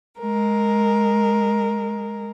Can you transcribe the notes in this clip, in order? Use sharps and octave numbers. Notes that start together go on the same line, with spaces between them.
G#3 A#4